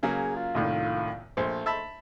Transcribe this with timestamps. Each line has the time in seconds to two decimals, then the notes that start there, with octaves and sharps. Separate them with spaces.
0.03 C#3 F#3 A#3 G#4
0.36 F4
0.55 C2 A2 D#3
1.37 A#1 A3 C5
1.66 E5 A5 B5